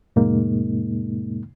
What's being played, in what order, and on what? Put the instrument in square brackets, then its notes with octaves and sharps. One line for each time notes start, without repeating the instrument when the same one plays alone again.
[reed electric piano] F2 A2 C3 G#3 A#3 D#4